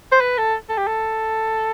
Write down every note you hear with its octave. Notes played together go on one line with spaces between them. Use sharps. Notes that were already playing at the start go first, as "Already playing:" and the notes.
C5
B4
A4
A4
G4
A4